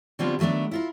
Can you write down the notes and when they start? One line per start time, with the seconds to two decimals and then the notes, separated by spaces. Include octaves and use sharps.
0.19 D3 F#3 G3 B3 C4 F4
0.39 D#3 F#3 A3 B3 D4
0.71 E4 F4 A#4